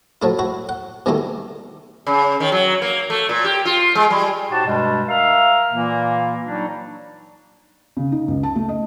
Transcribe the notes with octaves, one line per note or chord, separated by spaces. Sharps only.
F3 F#3 A3 E4
E4 F#4
F#5
B2 D#3 E3 G3 A3 E4
C#3
D#3
F#3
A#3
A3
A#2
G4
F4
G#3
G3
A2 D#4 F#4 G4 C5 A5
G2 B2 G3 G#3
A#4 E5 F5
A#2 E3 A#3
F#3 G3 D4 D#4
C#3
D#4
C#2
A5
A3
D#5